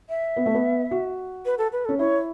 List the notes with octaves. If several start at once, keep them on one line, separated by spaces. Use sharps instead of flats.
E5
B3
A3
B3
F#4
B4
A4
B4
C#4 A4
E4 C#5